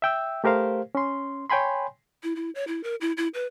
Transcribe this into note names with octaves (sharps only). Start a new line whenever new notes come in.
E5 G5 E6
A3 G4 A#4 C5 F5
C#4 C6
C#5 G5 G#5 B5 C6
E4
E4
C#5
E4
A#4
E4
E4
B4